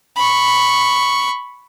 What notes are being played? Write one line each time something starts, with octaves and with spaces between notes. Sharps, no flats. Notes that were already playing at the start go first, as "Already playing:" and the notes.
B5 C#6